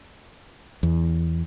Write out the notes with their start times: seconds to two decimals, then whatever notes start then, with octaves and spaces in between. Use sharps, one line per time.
0.83 E2